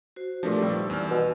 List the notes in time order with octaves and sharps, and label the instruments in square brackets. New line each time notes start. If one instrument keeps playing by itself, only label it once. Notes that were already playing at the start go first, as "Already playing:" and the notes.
[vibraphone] F#4 C5
[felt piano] A#2 D4 [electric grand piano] F3 A3 [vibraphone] G4 A#4 B4
[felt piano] D#3 G3 [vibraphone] D5 C#6 E6
[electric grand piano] E2 F6
[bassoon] B2